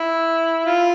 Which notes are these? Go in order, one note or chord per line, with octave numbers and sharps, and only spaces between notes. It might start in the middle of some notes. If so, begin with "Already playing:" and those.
Already playing: E4
F4